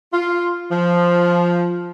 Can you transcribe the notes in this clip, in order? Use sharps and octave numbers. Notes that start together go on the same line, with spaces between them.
F4
F3